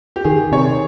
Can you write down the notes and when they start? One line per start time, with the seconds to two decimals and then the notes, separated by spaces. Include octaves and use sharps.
0.16 G4
0.24 D#3 G#4
0.52 C3 C#5